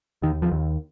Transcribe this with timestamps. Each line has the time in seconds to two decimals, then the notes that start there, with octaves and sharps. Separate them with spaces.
0.22 D#2 D#3
0.42 F3
0.52 D#2